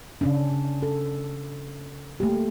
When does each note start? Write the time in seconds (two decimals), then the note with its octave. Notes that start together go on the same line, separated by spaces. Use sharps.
0.21 C#3 C#4 D4
0.83 A4
2.20 A3 A#3 G4